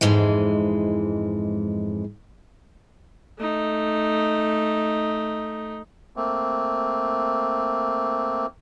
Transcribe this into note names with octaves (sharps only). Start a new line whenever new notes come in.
F2 G#2 E3 G#3
A3 D#4
A3 A#3 C4